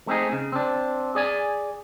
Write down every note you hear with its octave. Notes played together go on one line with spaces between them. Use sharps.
A3 C4 D#4 G#4
C#3
C4 D4
G#4 D5 G#5